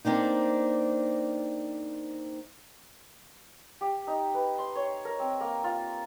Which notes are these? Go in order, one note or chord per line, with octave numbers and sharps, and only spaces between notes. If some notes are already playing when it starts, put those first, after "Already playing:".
A#3 C4 D4 D#4
G4
D#4
B4
C6
C#5
A#4
C4
A#3
F4